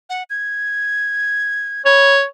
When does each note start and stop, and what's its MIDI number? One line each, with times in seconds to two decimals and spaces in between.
0.10 0.23 78
0.30 1.85 92
1.85 2.24 73
1.85 2.14 83